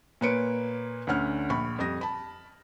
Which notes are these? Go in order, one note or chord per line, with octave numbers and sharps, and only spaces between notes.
A#2 A#3 B4 C#5 C#7 D7
D2 D3 C#4 F#5 F6
A#1 B5 C#6
F2 G3 D#6 A#6
A5 B5